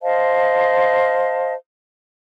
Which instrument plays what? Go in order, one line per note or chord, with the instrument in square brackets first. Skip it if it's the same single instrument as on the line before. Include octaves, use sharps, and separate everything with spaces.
[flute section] C5 D#5 F5 A5